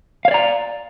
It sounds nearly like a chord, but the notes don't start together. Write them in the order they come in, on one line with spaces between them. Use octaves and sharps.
F5 C#5 D5 A#5